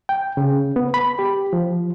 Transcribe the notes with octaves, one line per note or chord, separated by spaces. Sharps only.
G5
C#3
B3
B5
G4
F3